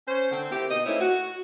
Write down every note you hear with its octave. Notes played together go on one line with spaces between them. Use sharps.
C#4 C5
D3 C4
A#3 C4 E4 G4
B2 A#3 D#4 D#5
A3 A#3 C4 C#4 D#4 E4
F#4